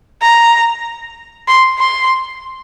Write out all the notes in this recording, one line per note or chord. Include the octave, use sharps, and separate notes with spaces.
A#5
C6
C6